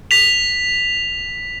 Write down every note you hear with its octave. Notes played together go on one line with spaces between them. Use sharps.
B6 F7